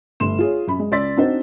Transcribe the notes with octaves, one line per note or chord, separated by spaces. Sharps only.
G1 A3 C6 E7
F4 G#4 C#5
F#2 B5
G#3
C#2 D5 C6 E6 A6 B6
C4 D4 D#4 F#4 C5